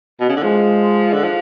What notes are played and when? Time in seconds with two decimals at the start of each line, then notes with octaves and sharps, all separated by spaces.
0.20 B2
0.29 C#3
0.37 D3
0.43 F3 G#3
1.13 D3
1.24 F3